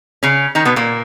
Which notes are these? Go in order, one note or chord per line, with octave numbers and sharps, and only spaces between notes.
C#3 C#4
D#3 D#4
B2 B3
A#2 A#3